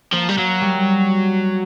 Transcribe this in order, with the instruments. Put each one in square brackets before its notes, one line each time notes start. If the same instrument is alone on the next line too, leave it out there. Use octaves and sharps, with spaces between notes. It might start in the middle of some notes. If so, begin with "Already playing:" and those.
[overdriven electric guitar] F3 [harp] A#3
[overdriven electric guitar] G3
[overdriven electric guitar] F#3 [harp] A#3
[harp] G3